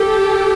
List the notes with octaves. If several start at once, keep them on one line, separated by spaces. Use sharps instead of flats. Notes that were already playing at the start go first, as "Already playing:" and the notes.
Already playing: G4 A4